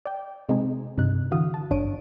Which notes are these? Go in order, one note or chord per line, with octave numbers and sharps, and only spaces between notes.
D5 G5
C3 G#3 C4 D#4 G#4
G2 C3 D#4 F#6
D3 E3 F#4 F5 D#6
A5
G#1 G2 D4 C#5 D7 D#7